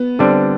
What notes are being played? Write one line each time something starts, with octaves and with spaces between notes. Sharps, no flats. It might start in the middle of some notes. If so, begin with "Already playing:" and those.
Already playing: B3
D3 G3 C4 D4